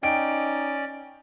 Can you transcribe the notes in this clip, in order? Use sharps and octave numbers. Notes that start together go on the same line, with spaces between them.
C#4 D#4 D5 G5 D7